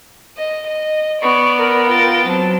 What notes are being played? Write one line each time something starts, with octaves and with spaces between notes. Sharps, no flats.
D#5
D#5
B3 D5 C#6
A#4
F4 G5 A6
F#3 C4 A5